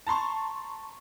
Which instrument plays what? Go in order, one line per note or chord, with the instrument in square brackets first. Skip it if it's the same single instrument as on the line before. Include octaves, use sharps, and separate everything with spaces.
[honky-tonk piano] A5 A#5 C6 C#6